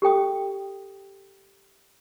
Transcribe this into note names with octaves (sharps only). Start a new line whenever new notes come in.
G4 A4 G5 D#6